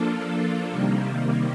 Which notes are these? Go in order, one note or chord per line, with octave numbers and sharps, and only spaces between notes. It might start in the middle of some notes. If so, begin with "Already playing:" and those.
Already playing: F3 A#3 D4 F4 A4
C3 D#3 G3 A#3